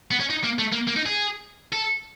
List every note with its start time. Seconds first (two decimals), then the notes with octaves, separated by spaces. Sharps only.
0.11 B3
0.20 C#4
0.30 D#4
0.44 A#3
0.59 A3
0.72 A#3
0.88 A#3
0.96 D#4
1.06 G#4
1.72 A4